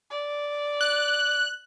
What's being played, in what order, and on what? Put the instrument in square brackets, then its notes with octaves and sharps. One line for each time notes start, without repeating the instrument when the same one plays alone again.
[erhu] D5
[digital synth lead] F#6